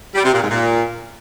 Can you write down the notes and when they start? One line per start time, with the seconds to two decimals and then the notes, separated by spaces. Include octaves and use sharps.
0.15 G3
0.24 C3
0.33 A#2
0.41 G#2
0.50 A#2